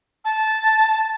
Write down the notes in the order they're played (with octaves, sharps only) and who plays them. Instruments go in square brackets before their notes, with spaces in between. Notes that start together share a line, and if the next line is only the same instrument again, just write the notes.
[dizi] A5